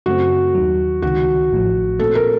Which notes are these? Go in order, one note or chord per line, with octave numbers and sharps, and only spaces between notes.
F#2 C#3 A3 C4 F#4
D#2 D#3 F#3
C#2 C3 D#3 F#4
A1 A2 F3
A#2 A3 C4 A4
A#4